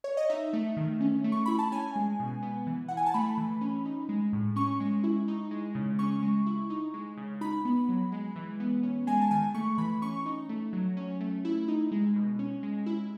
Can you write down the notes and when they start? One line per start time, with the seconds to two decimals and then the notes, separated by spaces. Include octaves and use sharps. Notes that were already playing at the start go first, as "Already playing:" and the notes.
0.04 C#5
0.17 D#5
0.30 D#4 E5
0.53 A3
0.77 D#3
1.00 C#4
1.24 A3
1.32 C#6
1.45 E4 B5
1.59 A5
1.72 C#4 G#5
1.96 G#3
2.20 B2
2.42 B3
2.67 E3
2.88 E4 F#5
2.97 G#5
3.06 A5
3.14 A3 B5
3.38 E3
3.61 C#4
3.85 D#4
4.09 G#3
4.33 A2
4.56 C#4 C#6
4.80 G#3
5.04 E4
5.28 D#4
5.51 G#3
5.75 C#3
5.99 C#4 C#6
6.23 G#3
6.46 E4
6.70 D#4
6.94 G#3
7.17 C#3
7.41 D#4 B5
7.65 B3
7.89 F#3
8.12 G#3
8.36 E3
8.60 B3
8.83 C#4
9.07 G#3 G#5
9.21 A5
9.31 D#3 G#5
9.54 A3 C#6
9.78 E3 B5
10.02 C#4 C#6
10.26 D#4
10.49 A3
10.73 F#3
10.97 C#4
11.21 A3
11.45 E4
11.68 D#4
11.92 G#3
12.16 B2
12.39 C#4
12.63 G#3
12.86 E4